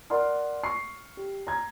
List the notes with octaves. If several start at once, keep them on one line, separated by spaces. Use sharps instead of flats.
A#4 D5 F#5 C6 F6
C#6 C7
G4
A#5 G#6